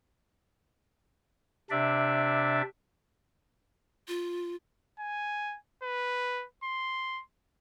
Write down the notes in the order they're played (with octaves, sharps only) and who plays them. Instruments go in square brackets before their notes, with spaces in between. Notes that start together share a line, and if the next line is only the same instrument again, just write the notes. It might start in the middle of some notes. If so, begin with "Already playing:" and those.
[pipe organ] C3 D4 D5 E5
[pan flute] F4
[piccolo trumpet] G#5
B4
C6